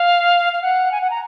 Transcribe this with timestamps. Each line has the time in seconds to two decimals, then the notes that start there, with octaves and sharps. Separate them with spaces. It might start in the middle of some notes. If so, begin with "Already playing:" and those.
Already playing: F5
0.53 F5
0.62 F#5
0.92 G#5
1.01 F#5
1.10 A#5